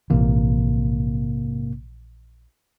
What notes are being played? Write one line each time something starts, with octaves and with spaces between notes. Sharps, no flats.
A#1 G#2 C3 E3 A#3